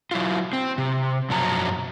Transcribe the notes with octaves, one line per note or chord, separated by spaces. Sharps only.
F#3 E4 F4
C4
C3
F#2 B2 F3 F#3 A5 A#5